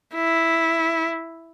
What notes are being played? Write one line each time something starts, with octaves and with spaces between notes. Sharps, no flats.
E4